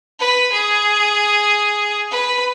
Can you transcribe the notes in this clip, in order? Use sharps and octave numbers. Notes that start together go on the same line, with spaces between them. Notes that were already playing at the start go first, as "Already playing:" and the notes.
B4
G#4
B4